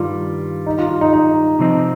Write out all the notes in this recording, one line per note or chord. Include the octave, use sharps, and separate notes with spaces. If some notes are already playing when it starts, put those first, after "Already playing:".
Already playing: G2 D#3 G3 F4
D#4
F4
F4
D#4
D#4
C3 F3 C4 D#4